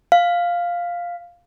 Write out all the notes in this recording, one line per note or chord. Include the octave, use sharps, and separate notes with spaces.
F5